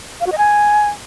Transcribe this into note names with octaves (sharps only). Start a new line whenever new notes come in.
F5
F#4
D#5
G#5